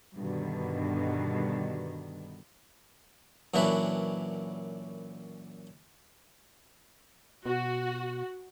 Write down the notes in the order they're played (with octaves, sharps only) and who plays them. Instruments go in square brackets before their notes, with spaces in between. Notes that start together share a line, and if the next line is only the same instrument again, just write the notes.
[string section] G2 B2 D3 D#3
[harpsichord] F#2 A#2 E3 D4 F#4 B4
[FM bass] B2 [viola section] F#4